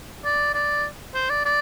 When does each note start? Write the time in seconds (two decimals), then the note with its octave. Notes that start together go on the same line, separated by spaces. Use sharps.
0.25 D5
0.54 D5
1.15 C5
1.30 D5
1.46 D5